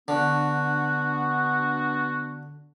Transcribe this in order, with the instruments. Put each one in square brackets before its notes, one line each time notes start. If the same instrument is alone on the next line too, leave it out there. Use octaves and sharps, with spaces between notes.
[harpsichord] D3 [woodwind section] B3 D4 F#4